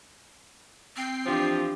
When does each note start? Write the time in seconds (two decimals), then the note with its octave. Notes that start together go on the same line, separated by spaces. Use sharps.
0.96 C4 G5 C7
1.25 E3 F3 D4 G4